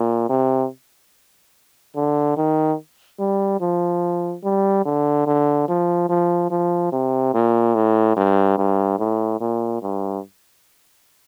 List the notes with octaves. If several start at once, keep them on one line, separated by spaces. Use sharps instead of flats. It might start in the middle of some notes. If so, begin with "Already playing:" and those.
Already playing: A#2
C3
D3
D#3
G3
F3
G3
D3
D3
F3
F3
F3
C3
A#2
A2
G2
G2
A2
A#2
G2